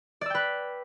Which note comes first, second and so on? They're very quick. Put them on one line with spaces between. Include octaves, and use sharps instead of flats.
D5 E6 G5 B4